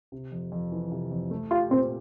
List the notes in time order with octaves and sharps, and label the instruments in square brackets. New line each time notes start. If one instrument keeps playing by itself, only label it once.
[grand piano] C3
F2
F2
E3
C3
F2
A3
[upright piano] F4 [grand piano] G4
[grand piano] A#2 [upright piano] C4